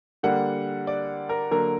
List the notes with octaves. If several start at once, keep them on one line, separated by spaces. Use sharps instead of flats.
D3 G3 A#3 F#5
D5
A#4
D3 F#3 A#3 A#4